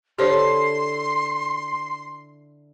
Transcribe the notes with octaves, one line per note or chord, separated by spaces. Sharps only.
D3 E4 G4 A4 C5 C#5 C6